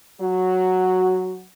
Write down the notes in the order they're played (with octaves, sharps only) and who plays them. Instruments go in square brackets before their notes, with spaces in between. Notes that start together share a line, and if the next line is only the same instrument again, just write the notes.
[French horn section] F#3 F#4